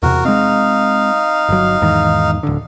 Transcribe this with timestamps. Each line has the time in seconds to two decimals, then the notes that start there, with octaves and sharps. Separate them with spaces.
0.02 E2 C3 F#4 A#4
0.25 G#3 C4 D#4 F5
1.49 G1 F#3
1.81 E2 G#2 D#3
2.43 D1 D3